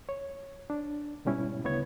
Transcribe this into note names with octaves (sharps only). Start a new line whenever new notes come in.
C#5
D4
G#2 B2 G3 C#4 E4
D2 C#3 B3 E4 C#5 G#6